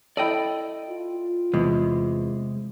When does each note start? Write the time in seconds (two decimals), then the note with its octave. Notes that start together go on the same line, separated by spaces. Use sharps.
0.17 E4 A4 D5 D#5 G5
0.89 F4
1.54 E2 C3 G#3